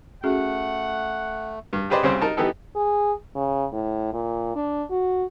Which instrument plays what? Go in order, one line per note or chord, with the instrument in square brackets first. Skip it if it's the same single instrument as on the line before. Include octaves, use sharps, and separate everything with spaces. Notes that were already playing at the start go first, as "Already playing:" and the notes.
[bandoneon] A3 [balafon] C#4 F#4 G#4 [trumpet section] F#5
[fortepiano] G2
G4 G#4 B4 C5 D5 D#5
C2 C#3 C4 C5
D#4 A#4 A5
E3 B3 D#4 G4 A4
[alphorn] G#4
C#3
A2
A#2
D4
F#4